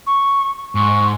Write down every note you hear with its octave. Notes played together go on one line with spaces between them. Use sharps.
C#6
G#2 C#6